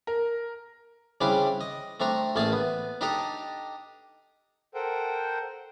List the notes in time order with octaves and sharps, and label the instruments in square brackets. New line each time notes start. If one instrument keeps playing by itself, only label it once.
[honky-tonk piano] A#4
[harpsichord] C#3 G3 C4 D4 E4 D6
D#5
A3 C4 D4 A#5 C#6
A1 A3 A#3 G#4 G#5 A5
B3
D4 D#4 G4 A4 D#5 A#5
[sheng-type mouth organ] A4 A#4 C5 F#5 G5